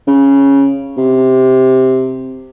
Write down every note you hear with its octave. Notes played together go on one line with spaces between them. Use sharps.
C#3
C3